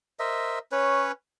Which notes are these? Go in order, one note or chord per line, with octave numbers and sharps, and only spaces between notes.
A#4 C5 D#5 E5
C#4 B4 C#5